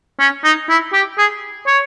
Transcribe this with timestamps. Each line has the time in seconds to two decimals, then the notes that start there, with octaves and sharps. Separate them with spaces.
0.20 C#4
0.44 D#4
0.69 E4
0.93 G4
1.18 G#4
1.67 C#5